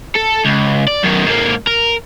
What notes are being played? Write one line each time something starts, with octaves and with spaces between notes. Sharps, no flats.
A4
C#2
D5
F#2 D#3
G#2 A#3
A#4